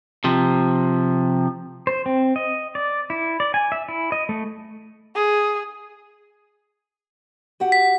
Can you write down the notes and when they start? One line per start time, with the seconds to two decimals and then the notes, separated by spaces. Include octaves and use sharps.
0.24 C3 F3
1.87 C5
2.06 C4
2.36 D#5
2.75 D5
3.10 E4
3.40 D5
3.54 G#5
3.72 E5
3.89 E4
4.12 D#5
4.29 A3
5.15 G#4
7.60 F#4 G4 F#5
7.72 B6